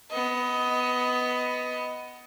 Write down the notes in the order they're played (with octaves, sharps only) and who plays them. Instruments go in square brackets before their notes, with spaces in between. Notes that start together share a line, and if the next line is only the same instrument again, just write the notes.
[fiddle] B3 D#5